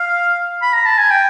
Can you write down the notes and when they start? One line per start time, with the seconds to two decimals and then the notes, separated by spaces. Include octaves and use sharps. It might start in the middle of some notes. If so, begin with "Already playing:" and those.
Already playing: F5
0.62 B5
0.73 A#5
0.86 A5
0.98 G#5
1.11 G5